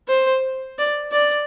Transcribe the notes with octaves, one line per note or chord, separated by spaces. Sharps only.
C5
D5
D5